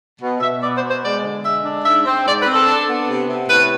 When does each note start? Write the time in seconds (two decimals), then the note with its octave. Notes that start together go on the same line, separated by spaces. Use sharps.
0.20 B2
0.41 B2 E5
0.62 B3 D5
0.75 C5
0.82 B2
0.89 C5
1.03 G#3 D5
1.23 D3
1.44 G#3 E5
1.65 D4
1.84 G#2 E5
2.06 C4
2.26 G#2 D5
2.40 B4
2.46 C4
2.53 A4
2.66 D4
2.87 B3
3.07 C3
3.29 C3
3.49 A2 B4